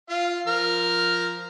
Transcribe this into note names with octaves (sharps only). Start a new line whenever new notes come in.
F4 F5
F3 A#4 F6